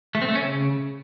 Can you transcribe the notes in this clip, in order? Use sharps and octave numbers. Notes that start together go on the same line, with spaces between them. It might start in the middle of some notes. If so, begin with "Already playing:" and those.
A3
C4
A3
C#4
C#3